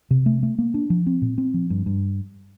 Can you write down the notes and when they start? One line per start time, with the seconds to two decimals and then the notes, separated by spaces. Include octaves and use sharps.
0.11 C3
0.26 A3
0.43 A3
0.59 A#3
0.74 D4
0.90 F3
1.07 C4
1.22 A#2
1.38 C4
1.54 F3
1.70 G2
1.86 G2